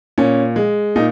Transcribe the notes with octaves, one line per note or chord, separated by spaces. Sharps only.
A#2 C#4
G#3
A#2 D#4